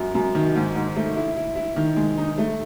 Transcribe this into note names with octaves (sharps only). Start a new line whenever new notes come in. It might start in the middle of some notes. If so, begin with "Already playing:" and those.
Already playing: F#2
F#2
D#3
G#2
G#2
A3
E4
E4
E4
D#3
G#3
D#4
A3